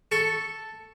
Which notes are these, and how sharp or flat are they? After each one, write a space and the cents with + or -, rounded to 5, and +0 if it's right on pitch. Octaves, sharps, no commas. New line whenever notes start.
A4 +0 C#6 +0